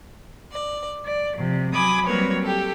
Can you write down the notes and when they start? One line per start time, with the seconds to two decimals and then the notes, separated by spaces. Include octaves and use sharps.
0.51 D5
1.05 D5
1.36 C3 F3
1.73 F#3 G#5 B5 D6 D#6
2.06 F#3 G3 A#3 C4 B4 C#5
2.42 G4 A4